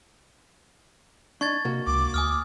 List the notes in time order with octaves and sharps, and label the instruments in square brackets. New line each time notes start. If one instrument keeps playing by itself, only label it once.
[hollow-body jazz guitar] D4 D#4 [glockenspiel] C#6 G#6 A6
[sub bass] C3 [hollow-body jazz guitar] A#3 F#4
[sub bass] C#2 [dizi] D6
[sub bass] D2 [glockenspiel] G#5 D#6 F6